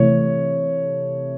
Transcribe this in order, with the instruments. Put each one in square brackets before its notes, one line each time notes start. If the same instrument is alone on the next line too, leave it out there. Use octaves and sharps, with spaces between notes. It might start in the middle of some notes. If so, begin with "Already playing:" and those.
Already playing: [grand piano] C3 E3 A3 C#5